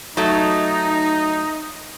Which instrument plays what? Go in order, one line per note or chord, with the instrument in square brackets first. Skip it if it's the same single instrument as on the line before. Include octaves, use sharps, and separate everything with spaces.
[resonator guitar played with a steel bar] F#3 A3 [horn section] D#4